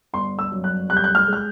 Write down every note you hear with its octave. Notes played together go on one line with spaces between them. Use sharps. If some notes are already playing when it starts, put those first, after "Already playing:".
G1 C6
E6
F#2
F#6
C2 F#6
G6
F#6
F6
G#3
F6